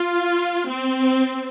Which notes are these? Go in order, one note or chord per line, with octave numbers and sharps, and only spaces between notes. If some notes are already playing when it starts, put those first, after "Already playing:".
Already playing: F4
C4